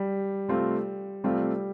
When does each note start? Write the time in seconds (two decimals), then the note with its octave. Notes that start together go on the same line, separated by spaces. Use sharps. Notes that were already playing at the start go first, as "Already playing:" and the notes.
Already playing: G3
0.49 C3 A3 C4 F4
1.24 C3 G3 A3 C4 F4